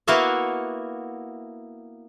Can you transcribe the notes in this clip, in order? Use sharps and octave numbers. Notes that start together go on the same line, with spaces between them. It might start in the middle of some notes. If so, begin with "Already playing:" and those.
A#3 B3 E4 F#4 E5 F5